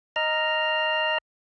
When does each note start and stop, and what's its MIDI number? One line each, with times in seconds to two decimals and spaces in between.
0.16 1.18 75
0.16 1.18 82
0.16 1.18 89